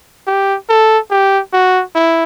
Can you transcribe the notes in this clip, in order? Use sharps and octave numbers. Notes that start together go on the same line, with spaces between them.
G4
A4
G4
F#4
E4